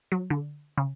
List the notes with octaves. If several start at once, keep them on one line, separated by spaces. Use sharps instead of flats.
F#3
D3
C#3